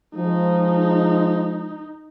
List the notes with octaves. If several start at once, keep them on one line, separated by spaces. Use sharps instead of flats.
F3 G#3 D#4